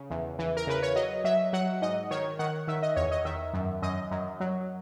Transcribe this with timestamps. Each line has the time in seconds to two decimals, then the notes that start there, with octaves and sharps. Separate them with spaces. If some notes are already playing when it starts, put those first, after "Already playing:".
Already playing: C#3
0.10 E2
0.39 E3
0.57 A#4
0.67 C#3 B4
0.83 C#5
0.96 F#3 D#5
1.24 F#3 E5
1.53 F#3 F#5
1.82 G#2 D#5
2.11 D#3 C#5
2.39 D#3 F#5
2.68 D#3 E5
2.82 D#5
2.96 E2 C#5
3.12 D#5
3.25 D#3 E5
3.53 F#2
3.82 F#2 D#5
4.11 F#2
4.40 F#3